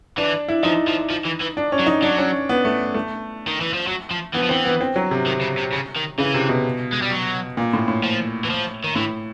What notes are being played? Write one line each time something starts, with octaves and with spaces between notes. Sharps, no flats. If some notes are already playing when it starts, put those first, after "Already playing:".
E3 D4
E4
F3 D#4
F3
F3
E3
E3
D4
C#4
F#3
D#4
F#3 D4
C#4
B3
A3
A3
D#3
E3
F3
F#3
F3
E3 B3
F3
E3 C4
B3
C4
F#3
C3
D#3
C#3
C3
C#3
D#3
C#3 E3
C3
B2
G#3
G3
F#3
A#2
A2
A2
F3
E3
F3
D#3
A2 E3